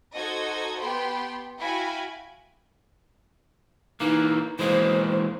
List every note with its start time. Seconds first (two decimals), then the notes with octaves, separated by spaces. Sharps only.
0.14 D#4 F#4 A4 C5 D#5 G#6
0.79 B3 G4 G5 A5 B5 C6
1.59 E4 F#4 F5 G5 G#5 B5
4.00 E3 A#3 D#4
4.59 E3 G#3 A#3 C5